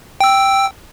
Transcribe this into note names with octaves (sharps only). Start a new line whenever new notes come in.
G5 E6